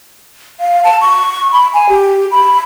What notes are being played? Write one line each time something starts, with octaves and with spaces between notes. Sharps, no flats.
F5
A5
C#6
B5
G#5
G4
B5